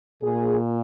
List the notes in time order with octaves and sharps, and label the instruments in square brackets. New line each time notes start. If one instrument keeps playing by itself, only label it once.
[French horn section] A#2 G#4